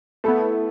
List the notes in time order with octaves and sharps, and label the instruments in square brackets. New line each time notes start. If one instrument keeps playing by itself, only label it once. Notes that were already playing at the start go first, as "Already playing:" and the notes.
[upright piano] A3 [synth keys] B3 E4 A4